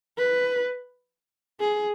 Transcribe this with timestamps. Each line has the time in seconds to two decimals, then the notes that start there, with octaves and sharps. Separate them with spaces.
0.18 B4
1.60 G#4